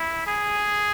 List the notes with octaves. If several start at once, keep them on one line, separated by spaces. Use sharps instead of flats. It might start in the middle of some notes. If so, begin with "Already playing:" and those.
Already playing: E4
G#4